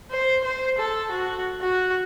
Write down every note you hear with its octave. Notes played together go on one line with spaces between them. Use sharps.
C5
C5
A4
F#4
F#4